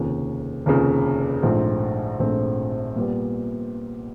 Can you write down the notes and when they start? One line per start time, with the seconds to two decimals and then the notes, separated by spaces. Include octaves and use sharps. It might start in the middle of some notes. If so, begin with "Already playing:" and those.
Already playing: F1 D#2 C#3 F3
0.66 F1 D#2 C#3 F3
1.43 A#1 G#2 F3 A3 C4
2.19 A#1 G#2 F3 A3 C4
2.96 A#2 G3 B3